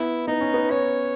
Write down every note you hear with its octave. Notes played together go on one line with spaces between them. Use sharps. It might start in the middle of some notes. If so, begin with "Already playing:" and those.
Already playing: B3 E4
B3 D#4
C#4
B3
C#4 C#5